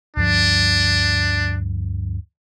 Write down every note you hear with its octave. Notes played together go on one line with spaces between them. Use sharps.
D2 G2 F3 D4